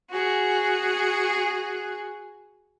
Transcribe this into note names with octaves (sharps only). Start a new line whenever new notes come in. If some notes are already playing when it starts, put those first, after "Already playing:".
F#4 G#4